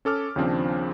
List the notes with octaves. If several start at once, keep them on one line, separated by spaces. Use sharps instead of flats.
C#4 A4 D6 F6
D#2 C#3 F3 C4 D4